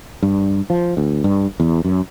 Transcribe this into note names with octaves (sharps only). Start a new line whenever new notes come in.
G2
F3
D2
G2
E2
F#2